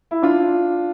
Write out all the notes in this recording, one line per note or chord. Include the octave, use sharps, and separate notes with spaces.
E4
D4 F4